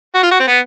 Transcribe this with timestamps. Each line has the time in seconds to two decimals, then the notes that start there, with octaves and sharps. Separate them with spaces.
0.15 F#4
0.23 F4
0.31 F#4
0.39 C4
0.48 B3